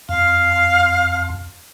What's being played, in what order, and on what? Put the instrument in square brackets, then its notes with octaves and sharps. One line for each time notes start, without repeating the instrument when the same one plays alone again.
[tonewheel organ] F2 [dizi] F5